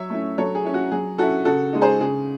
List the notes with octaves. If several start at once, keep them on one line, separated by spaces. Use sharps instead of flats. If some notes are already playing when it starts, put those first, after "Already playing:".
Already playing: F#3 C#5 E5
A3 C#4 E4
F#3 A4 C#5
G#4
C#4 E4
F#4
F#3 G#4
C#4 E4 F#4 A4
C#3 F#4 A4
G#3 D#4
G#4 C5
C#3 G#4